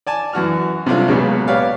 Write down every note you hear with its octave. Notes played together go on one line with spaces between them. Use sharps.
D5 G#5 A5
F#2 E3 F#4 F6
C3 F#3 G3 D4 F4 A4
C#2 A#2 C#3 F#3 B3
G4 B4 C#5 D5 F5